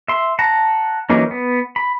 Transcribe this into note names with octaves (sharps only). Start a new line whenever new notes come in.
E5 C6
F#5 A5 A#5
E3 F#3 A#3 C#4 D#4
B3
B5